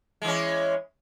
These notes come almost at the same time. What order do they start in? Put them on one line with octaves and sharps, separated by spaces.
G#3 E3 C#4